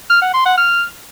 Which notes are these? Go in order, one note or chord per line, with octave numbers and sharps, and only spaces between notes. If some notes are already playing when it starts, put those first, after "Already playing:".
F6
F#5
C6
F#5
F6